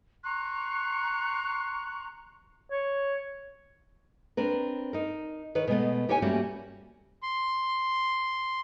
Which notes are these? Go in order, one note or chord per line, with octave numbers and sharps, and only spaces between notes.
A#5 C6 C#6 F#6
C#5
C4 D4 A#4 B4
D#4 A#4
D#3 B4 C#5
B2 G#3 A3 B3
D#4 G4 A#4 C#5 F5 G#5
G3 A3 A#3 C#4 F#4 G4
C6